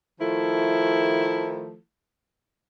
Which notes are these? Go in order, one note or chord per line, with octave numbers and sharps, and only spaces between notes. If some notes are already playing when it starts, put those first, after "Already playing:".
D#3 F3 A3 E4